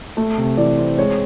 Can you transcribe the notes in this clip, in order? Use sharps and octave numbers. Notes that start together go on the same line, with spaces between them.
A3
C3
E3 D5
C4
G#3 C#5